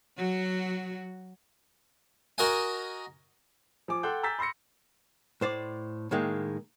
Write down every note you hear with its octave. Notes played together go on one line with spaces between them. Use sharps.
F#3 F#4
F#4 A#4 D#5 F#5 G#5
F3 G#5 D6
A4 F#5 G5 C6 F#6 G6
G#5 A#5 E6 G6 A6 B6
B5 C6 E6 A#6 C#7
A2 C5 D5
A2 D#3 G#3 A#3